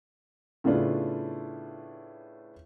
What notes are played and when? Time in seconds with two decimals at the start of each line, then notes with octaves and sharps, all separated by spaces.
0.64 A2 C#3 A3 B3 D4 F4